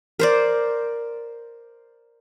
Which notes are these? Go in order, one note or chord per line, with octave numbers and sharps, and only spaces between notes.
A#4 C5 D5